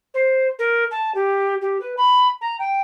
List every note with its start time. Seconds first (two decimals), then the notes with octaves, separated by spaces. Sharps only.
0.14 C5
0.59 A#4
0.91 A5
1.14 G4
1.61 G4
1.80 B4
1.97 B5
2.41 A#5
2.59 G5